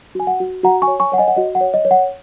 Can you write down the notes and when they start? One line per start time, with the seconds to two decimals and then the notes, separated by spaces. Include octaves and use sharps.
0.15 F#4 G#5
0.27 F#5
0.40 F#4
0.63 F#4 F#5 A#5
0.82 G#5 C#6
0.88 C#5
1.00 G#5 C#6
1.12 C#5 F#5
1.18 D#5 G#5
1.28 F#5
1.36 F#4 D#5
1.55 F#5
1.61 C#5
1.74 D#5
1.85 C#5
1.91 F#5